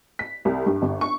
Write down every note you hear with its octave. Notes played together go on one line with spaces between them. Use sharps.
B6
C2
G2
G1
C#6